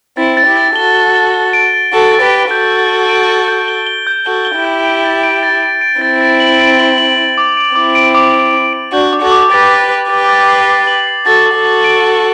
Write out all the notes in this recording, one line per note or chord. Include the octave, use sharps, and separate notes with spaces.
C4 E4 A6
A6
E4 G4
A6
F#4 A4 G7
G7
G7
G7
D7
A6
F#4 A4 A6
A6
G4 B4
A6
F#4 A4 G6
G6
G7
D7
G7
G6
G7
G7
G6
F#4 A4 G7
G7
E4 G4
G6
D7
A6
D7
A6
D7
D7
C4 E4 A6
A6
F#7
D7
F#7
F#7
D7
D6
D7
C4 E4 D6
D7
D6
D6
D6
D7
D4 F#4 G6
D6
F#4 A4
D6
G4 B4 A6
A6
A6
G4 B4 A6
A6
C7
C7
F#7
C7
F#4 A4 A6
A6
F#4 A4
F#7
D7
A6